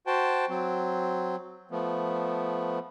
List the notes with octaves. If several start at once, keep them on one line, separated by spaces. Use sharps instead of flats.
F#4 C5 G5 A5
F#3 C4
F3 A3 B3